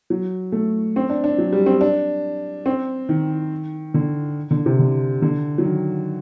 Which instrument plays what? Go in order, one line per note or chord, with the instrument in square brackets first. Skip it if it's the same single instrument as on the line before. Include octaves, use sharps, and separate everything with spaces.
[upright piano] F#3
A3
C4
D4
D4
F#3
G3
C4
D4
C4
D#3
D3
D3
C3
D3
D3
F#3
D#3